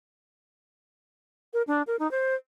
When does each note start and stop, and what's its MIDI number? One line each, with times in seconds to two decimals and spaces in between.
1.53 1.62 70
1.67 1.82 62
1.87 1.96 70
1.99 2.09 63
2.11 2.34 72